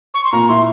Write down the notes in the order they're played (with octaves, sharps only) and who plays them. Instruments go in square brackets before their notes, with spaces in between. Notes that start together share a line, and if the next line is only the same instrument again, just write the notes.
[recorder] C#6
C6
[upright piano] A#2 [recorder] A#5
[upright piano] E4 [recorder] C6